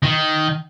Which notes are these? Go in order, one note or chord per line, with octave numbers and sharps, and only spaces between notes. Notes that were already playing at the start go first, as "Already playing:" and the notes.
D#3